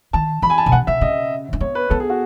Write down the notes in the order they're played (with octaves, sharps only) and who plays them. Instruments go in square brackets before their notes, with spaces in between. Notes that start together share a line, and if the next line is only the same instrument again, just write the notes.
[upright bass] D#3 [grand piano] A5
[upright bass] E3 [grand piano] B5
[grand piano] G#5
A5
[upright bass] B2 [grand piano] G#5
[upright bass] C#3 [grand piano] F#5
[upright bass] C#3 [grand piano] E5
[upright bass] C#3 [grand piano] D#5
[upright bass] C#4
[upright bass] B3 [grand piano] C#5
[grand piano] B4
[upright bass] B3 [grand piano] A4
[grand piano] G#4
F#4